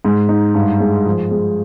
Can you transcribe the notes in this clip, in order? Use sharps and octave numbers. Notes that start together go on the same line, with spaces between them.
G#2
D#4
G2
G#3
F3
G#3